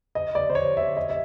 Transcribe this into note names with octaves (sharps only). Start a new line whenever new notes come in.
D#5
D5
C5
C#5
E5
D#5
E5